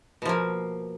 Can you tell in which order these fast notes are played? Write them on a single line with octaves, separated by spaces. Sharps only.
B2 F3 A#3